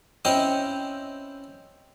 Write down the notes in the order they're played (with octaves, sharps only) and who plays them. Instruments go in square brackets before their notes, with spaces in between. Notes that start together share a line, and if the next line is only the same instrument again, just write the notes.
[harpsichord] C4 C#4 E4 D#5 G5